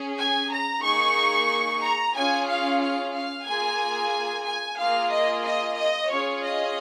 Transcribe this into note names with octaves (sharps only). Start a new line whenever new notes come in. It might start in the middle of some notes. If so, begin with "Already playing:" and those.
Already playing: C#4 G#4
G#5
A#5
A#3 D#4 G#4 C#6
A#5
C#4 F4 G#4 G#5
F5
F5
F5
A#3 F4 G#4 G#5
G#5
A#3 F4 G#4 F5
D#5
D#5
D#5
C#4 F4 G#4 C#5
D#5